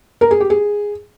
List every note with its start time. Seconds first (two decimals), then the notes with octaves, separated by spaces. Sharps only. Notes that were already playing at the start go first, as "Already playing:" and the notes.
0.21 A#4
0.31 G#4
0.40 G4
0.50 G#4